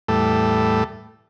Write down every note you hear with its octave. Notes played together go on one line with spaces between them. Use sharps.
E2 A2 G3 A3 A4